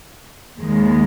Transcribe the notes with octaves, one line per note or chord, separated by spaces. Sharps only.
D#2 D#3 G#3